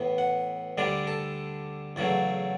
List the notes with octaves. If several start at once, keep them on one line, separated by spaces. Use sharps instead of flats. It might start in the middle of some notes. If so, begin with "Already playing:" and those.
Already playing: A2 E3 B3
F#5
D2 D3 G3 D4 D5
A4
E2 C#3 F#3 A3 D5